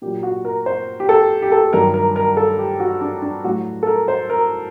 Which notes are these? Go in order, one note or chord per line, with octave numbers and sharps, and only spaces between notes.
A#2 F#3 G4
F#4
A#4
C5
G4
A4
G4
A4
G2 D#3 F#3 A#4
A#4
A#4
A4
G4
F#4
D4
D4
A2 F#3 F#4
A4
A#4
C5
A#4